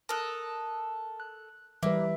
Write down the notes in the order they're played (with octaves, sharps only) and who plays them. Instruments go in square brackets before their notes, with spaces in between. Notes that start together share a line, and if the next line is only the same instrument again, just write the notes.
[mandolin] A4 A#4 [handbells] A5 D#6 F#6
[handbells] F#6
[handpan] E3 G3 B4 [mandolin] A#3 [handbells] E5